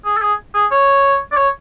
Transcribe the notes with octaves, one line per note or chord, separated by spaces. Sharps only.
G#4
A4
G#4
G#4
C#5
D5
C#5